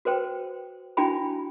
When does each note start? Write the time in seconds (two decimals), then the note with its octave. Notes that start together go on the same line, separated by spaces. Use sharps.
0.05 F#4 B4 C5 G5
0.97 D4 E4 F#4 G5 G#5 B5